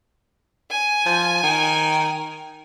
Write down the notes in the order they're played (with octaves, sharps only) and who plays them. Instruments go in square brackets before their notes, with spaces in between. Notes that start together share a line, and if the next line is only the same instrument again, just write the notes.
[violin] G#5
[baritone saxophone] F3
D#3